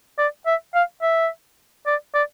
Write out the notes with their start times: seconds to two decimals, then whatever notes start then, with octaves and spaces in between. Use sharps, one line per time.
0.18 D5
0.46 E5
0.74 F5
1.02 E5
1.87 D5
2.14 D5